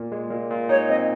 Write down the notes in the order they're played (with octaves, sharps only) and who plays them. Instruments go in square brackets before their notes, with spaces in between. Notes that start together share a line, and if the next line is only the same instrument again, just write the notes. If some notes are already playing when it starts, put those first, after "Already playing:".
Already playing: [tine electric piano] A#2
G#3
A#2
A#2
[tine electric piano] D#4 [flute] C#5
[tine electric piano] C4 [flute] D#5